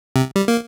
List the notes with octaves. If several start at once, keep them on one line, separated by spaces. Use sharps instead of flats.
C3
G3
A#3